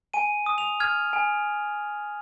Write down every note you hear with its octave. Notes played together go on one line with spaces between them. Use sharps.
G#5 D#7
D#6
F7
F6 G#6
G#5